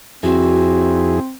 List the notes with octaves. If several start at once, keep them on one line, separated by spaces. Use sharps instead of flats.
F2 C4 E4 F#4 G#4